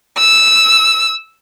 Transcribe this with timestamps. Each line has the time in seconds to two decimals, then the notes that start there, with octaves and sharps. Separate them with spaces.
0.18 E6